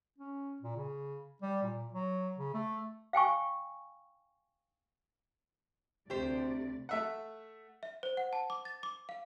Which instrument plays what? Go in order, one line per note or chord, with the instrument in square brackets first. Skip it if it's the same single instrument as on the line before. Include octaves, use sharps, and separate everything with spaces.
[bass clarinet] C#4
A#2
C#3
G3
A#2
F#3
C#3
A3
[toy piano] F5 G5 G#5 C#6
[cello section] D2 C3 D5 [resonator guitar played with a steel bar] G4 C5
[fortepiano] A3 E5 F#5
[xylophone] E5
C5
F#5
A5
D6
A6
D6
F5